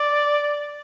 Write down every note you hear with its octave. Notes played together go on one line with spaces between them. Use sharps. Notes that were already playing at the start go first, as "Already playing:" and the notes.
Already playing: D5